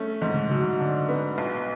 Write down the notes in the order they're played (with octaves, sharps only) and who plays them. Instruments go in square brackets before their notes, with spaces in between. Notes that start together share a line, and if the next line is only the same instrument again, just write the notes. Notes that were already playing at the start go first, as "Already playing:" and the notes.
Already playing: [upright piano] A3 C#4
[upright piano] G#2 [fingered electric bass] E3
[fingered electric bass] D3
[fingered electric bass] C#3 [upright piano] F#3
[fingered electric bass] D3
[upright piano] D4
B3
B1